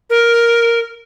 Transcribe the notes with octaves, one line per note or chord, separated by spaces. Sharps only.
A#4